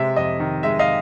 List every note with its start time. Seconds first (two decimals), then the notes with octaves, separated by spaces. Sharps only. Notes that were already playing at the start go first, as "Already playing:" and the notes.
Already playing: C3 G#3 E5
0.16 F2 D#5
0.40 D#3
0.63 G#3 E5
0.79 D#5 F5